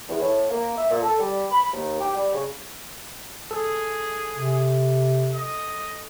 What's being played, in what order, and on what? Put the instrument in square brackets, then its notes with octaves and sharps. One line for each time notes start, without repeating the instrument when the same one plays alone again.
[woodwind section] E2
A2
A#3
E5
A#2
A4
G3
B5
D#2
G4
G3
C#3
[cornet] G#4 [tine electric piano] A4
[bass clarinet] C3
[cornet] D#5